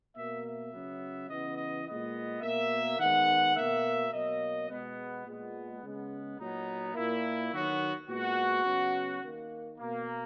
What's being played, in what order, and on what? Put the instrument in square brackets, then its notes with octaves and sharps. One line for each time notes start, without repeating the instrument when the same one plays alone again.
[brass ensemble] B2 A#3 E5
E5
C#3 F#3 B3
C#3 E3 B3 D#5
D#5
A#2 G#3 B3 D#5
B2 A#3 E5
D#3 G#3 B3 F#5
B2 A#3 E5
B2 F#3 A#3 D#5
B2 G#3 B3
A#2 G#3 B3
C#3 G#3 B3
A#2 F#3 B3 D#4
A#2 A#3 E4
D#3 F#3 B3 F#4
A#2 G#3 B3 F#4
C#3 F#3 B3
D#3 A#3
B2 A#3